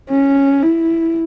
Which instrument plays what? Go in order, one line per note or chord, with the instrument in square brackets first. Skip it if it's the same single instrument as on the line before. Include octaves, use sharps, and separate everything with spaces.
[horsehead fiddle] C#4
E4